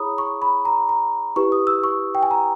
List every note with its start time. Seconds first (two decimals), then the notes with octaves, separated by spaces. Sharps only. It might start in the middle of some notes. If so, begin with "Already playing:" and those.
Already playing: E4 G#4 C#5 A#5 B5 D#6
0.18 C#6
0.42 B5
0.65 A#5
0.89 A#5
1.36 E4 G4 B4 C#6
1.52 D#6
1.67 E6
1.84 C#6
2.15 G5
2.23 G#5
2.31 A#5